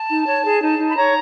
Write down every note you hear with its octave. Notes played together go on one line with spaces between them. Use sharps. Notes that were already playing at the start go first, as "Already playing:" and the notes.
Already playing: A5
D#4
C#5
G#4
D#4
D#4
B5
C#5 A#5